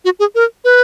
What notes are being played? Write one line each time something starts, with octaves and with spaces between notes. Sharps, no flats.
F#4
G#4
A#4
B4